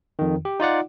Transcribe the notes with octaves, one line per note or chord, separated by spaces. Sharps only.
F2 D#3
G4
D#4 F4 D5 F#5